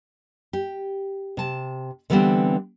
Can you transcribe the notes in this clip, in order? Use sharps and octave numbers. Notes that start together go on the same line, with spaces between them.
G4
C3 A5
D3 E3 G3 B3 C4